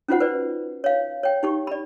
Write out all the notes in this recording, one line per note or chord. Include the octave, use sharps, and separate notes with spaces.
C#4 D#4 F4 F#4 C5 F#5
B4 C5 D5
C#5 F5
C#5 G5
D#4 G4 C#6
D5 B5